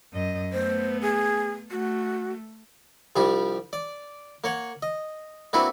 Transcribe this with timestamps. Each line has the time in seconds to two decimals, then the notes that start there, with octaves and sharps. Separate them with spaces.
0.13 F#2 D#5
0.53 A3 B3 C5
1.02 G#4
1.71 A3 F#4
3.16 C2 F3 G3 D4 G4
3.73 D5
4.44 A#3 C#5 F#5
4.82 D#5
5.53 A#3 C4 D4 E4 F#4 B4